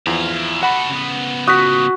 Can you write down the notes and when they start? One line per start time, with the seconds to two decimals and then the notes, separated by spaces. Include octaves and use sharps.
0.07 E2 F3 E4 F5
0.63 F#4 A4 F#5 B5
0.90 C#3 B3
1.47 F#4 D#6 B6